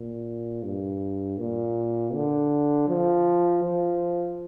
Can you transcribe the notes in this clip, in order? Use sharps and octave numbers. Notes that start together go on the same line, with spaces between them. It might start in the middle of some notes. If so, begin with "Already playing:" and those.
Already playing: A#2
G2
A#2
D3
F3
F3